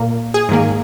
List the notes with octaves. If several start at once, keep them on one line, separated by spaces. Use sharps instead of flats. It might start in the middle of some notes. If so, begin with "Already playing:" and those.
Already playing: A#2 A#3
G#4
G#2 D#3 A#3